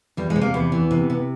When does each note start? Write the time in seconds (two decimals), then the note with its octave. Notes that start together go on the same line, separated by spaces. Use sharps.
0.17 E2 G3
0.30 G#3
0.36 C3
0.41 A#3
0.54 E2 B3
0.72 E3
0.91 C3
1.10 C3